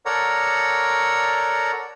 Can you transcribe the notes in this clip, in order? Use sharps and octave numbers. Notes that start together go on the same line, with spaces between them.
A4 A#4 C#5 D5 F#5 A#5